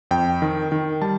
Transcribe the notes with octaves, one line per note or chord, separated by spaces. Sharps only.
F2 G5
D#3
D#3
G3 A5